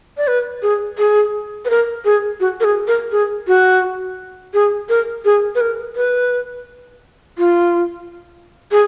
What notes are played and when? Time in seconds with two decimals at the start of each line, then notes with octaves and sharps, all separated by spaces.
0.17 D5
0.28 B4
0.62 G#4
0.98 G#4
1.65 B4
1.70 A#4
2.05 G#4
2.40 F#4
2.60 A#4
2.64 G#4
2.88 A#4
3.12 G#4
3.47 F#4
4.54 G#4
4.89 A#4
5.25 G#4
5.55 B4
5.61 A#4
5.96 B4
7.38 F4
8.72 G#4